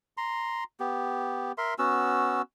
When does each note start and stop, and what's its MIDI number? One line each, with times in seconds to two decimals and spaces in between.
0.17 0.64 82
0.17 0.64 84
0.80 1.52 59
0.80 1.52 67
1.58 1.74 70
1.58 1.74 76
1.58 1.74 84
1.79 2.42 59
1.79 2.42 61
1.79 2.42 66
1.79 2.42 88